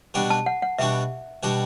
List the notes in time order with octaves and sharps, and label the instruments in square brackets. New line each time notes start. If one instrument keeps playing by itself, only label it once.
[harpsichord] B2 G3 D4 F#4
[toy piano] A5
F#5
F#5
[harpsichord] B2 G3 D4 F#4 [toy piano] E5
[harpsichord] B2 G3 D4 F#4